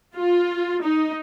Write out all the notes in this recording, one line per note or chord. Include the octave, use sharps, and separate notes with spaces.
F4
D#4